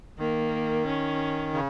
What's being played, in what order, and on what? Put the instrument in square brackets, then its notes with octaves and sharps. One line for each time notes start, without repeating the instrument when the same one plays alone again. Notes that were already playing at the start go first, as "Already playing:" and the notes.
[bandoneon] D#3 [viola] A#3
[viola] C#4
[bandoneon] C#3